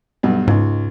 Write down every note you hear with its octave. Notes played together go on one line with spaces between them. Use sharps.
B1 G2
C#2 G#2 D#4